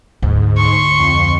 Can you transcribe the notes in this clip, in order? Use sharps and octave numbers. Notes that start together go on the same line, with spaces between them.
D2 G#2
C6 C#6
F2